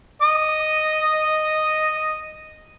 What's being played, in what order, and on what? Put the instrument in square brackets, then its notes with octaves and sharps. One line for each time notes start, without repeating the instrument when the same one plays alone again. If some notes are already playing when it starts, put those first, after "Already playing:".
[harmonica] D#5 D#6